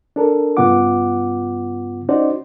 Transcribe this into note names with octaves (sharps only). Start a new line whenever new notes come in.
D4 A4 A#4
G2 C#3 B3 F4 F#5 D6
C#4 D#4 F#4 C5 D5